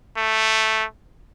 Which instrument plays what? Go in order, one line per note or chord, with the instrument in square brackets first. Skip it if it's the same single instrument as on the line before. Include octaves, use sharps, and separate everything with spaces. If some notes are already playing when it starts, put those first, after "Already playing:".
[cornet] A3